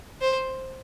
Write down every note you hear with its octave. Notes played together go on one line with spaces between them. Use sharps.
C5